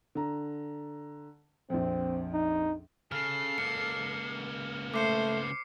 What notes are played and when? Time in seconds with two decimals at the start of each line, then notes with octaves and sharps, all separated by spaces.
0.15 D3 A#5
1.70 A#1 F2 C4
2.33 D#4
3.12 C#3 A4 F6 C7
3.58 C#2 A#3 C#7
4.94 A3 C5 D6 C7 C#7